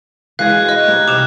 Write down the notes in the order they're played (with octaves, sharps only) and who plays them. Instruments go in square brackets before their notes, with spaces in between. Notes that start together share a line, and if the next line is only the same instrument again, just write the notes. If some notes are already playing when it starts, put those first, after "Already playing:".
[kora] E3 G#3 F#4 [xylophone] F5 [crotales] F#6 G#6
[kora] C#5 [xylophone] D#5 [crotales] F#6
[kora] G3 C4 D#4
[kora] C3 [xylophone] D6 [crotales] D#6 F6 E7